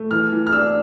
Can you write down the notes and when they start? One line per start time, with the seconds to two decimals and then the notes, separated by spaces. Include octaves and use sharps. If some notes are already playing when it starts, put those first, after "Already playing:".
Already playing: A3
0.11 E3 F6
0.32 E3
0.47 F6
0.53 D4 E6